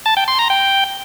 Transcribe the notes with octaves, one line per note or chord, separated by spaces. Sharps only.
A5
G5
C6
A#5
G5